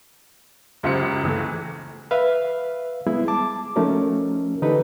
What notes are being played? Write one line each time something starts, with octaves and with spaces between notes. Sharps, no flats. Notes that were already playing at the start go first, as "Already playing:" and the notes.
C#2 F#2 F4 G4 C5 C#7
C#2 E3 A3
B4 E5 F5
G3 G#3 B3 E4 G#4
A5 D6
F3 A3 C#4 D#4 F#4 A#4
D3 E3 D#4 G4 A4 B4